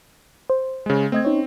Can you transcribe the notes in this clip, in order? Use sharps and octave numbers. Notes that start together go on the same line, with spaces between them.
C5
C#3 G#3
A3 C4 D#5 G#6
C#4 D#4 C#5